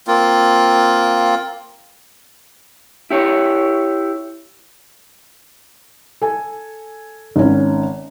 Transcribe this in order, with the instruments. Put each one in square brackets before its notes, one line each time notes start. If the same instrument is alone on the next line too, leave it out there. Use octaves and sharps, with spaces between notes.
[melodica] A#3 C4 F4
[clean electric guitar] E4 G4 C#5
[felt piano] A4 G#5
G#1 C#4